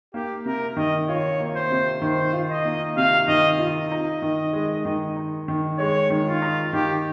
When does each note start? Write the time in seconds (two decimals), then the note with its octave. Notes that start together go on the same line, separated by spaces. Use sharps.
0.14 A#3 G4
0.46 C3 A#4
0.77 D#3 D#5
1.08 F4 C#5
1.40 A#3
1.56 C5
1.71 C3
2.02 D#3 C5
2.33 F4
2.50 D#5
2.65 A#3
2.97 C3 F5
3.28 D#3 D#5
3.59 F4 D#5
3.91 D#4
4.22 D#3
4.53 G#3
4.85 D#3
5.16 D#4
5.48 D#3
5.79 G#3 C#5
6.10 D#3
6.26 F4
6.42 D#4
6.73 D#3 G4